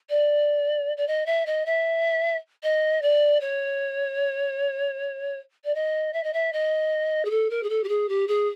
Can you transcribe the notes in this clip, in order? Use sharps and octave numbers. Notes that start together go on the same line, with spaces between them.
D5
D5
D#5
E5
D#5
E5
D#5
D5
C#5
D5
D#5
E5
D#5
E5
D#5
G#4
A4
A#4
G#4
A4
G4
G#4
G4
G#4